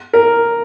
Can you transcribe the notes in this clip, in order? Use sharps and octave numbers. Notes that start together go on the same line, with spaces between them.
A#4